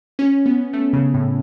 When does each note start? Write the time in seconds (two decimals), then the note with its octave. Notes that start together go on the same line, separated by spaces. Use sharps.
0.19 C#4
0.46 B3
0.73 A3
0.93 C#3
1.14 A2